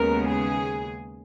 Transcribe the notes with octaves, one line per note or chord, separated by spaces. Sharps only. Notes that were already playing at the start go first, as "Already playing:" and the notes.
Already playing: D#2 C#3 G#3 B3 A#4
G#4